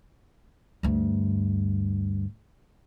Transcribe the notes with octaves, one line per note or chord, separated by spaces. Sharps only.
D2 G2